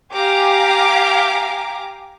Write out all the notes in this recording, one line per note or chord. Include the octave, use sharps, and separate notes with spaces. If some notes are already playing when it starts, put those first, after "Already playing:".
G4 F5 G#5 A#5 D6